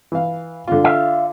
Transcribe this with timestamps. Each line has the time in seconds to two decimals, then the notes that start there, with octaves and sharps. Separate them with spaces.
0.12 E3 F5
0.68 D3 F4
0.84 E5 F5